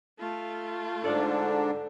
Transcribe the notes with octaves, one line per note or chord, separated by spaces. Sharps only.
A3 F4
G#2 D3 D4 A4 D5